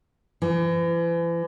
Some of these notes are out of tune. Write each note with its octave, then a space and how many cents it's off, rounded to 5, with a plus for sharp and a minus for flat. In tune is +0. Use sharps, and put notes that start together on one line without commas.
E3 +40